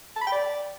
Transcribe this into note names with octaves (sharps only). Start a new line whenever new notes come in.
A5
B5
G5
D5